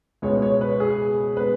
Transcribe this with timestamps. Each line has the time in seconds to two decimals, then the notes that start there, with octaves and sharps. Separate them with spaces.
0.22 C#2 B2 G#3 B3 C#5
0.42 C#5
0.61 B4
0.80 G#4
1.37 G#3 B3 B4